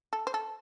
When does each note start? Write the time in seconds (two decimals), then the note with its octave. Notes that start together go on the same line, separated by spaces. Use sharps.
0.13 A4
0.27 C5
0.34 A4